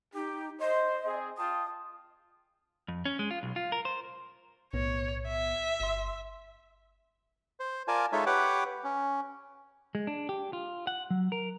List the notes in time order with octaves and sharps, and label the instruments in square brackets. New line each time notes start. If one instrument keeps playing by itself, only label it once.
[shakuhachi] D#4 [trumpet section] G4
[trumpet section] C5 [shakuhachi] D#5
[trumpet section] C4 G#4
[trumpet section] F4 G5 A5 [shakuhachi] D#6
[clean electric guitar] F2
C#4
G#3
F4
B1
F4
A#4
C5
[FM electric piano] B1 A2 B3 [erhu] C#5
[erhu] E5
[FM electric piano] G1 C6
[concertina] C5
F4 A#4 D5 G#5 A5
G#3 D#4 F4 A4 C#5 E5
G4 B4 C#5 F#5 D6
C#4
[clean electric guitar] G#3
D4
G4
F4
F#5
F#3
A#4